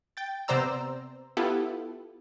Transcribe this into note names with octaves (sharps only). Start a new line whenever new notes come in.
G5 A6
C3 B3 C5 D5 A#5 E6
B3 E4 F4 G4 A4